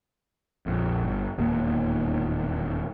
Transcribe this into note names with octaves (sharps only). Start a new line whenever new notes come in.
A#1 F2
G1
E1 D#2 A#2 A#3